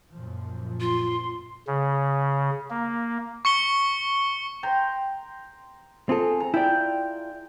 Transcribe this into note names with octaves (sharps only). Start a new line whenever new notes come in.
F#2 A#2 F3
F4 C6
C#3
A#3
C#6 C#7 G7
G5 A#5 C6
C4 F4 G#4 A4
A#5
E4 F4 D5 G5